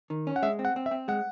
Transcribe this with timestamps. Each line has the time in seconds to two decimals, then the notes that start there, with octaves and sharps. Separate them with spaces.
0.10 D#3
0.27 C#4
0.36 F#5
0.42 G#3 E5
0.59 C4
0.65 F#5
0.76 C4
0.86 E5
0.91 C4
1.08 G#3 F#5